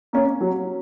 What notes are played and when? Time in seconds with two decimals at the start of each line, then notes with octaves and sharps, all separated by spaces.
0.13 A#3 C#4
0.40 F#3